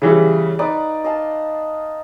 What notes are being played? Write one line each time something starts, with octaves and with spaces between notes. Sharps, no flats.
C#3 E3 G3 F5
D#4 B4 D5
D#5 F5 A5